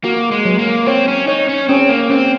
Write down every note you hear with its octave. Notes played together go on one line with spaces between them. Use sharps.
A#3 F#4
G#3
F#3
A#3
C4 C#5
C#4
D#4 C#5
C#4
C4 C#4
A#3
C4 C#4